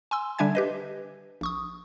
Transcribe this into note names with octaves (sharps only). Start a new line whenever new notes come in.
G#5 C6 E6
D3 G3 D4 E5 G#5 G#6
G4 B4 D#5
A#1 C#6 D#6